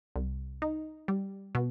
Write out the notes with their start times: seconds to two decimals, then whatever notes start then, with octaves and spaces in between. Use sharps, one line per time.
0.16 C2
0.62 D#4
1.08 G3
1.55 B2